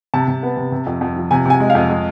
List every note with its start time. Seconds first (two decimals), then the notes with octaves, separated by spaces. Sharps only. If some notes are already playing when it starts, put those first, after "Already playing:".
0.14 C3 A5
0.28 C3
0.43 B3
0.57 C3
0.72 C3
0.86 F2
1.01 F2
1.16 F3
1.31 C3 G#5
1.45 C3 G#5
1.60 G#3
1.70 F2 F5
1.90 G#3